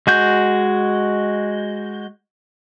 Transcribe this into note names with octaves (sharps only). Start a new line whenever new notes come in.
G#3 F#4 G6